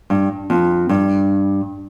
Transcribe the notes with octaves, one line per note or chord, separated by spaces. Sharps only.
G2
F2
G2